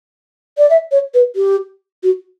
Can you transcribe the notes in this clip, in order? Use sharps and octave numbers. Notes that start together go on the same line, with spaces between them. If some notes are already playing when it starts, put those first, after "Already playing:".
D5
E5
C#5
B4
G4
F#4